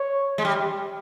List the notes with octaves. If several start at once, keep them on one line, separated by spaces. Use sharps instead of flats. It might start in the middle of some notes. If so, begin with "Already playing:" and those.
Already playing: C#5
G#3
G3